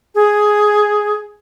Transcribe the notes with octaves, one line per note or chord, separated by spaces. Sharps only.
G#4